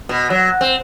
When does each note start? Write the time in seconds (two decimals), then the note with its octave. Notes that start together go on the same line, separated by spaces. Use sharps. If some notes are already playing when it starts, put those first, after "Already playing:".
0.09 B2
0.30 F#3
0.61 C4